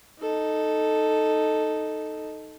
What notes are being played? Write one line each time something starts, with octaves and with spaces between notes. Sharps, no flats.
D#4 A4